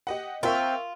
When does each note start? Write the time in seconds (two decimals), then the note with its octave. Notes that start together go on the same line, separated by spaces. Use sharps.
0.07 G4 D#5 F#5
0.43 C4 F4 A#4 E5 C#6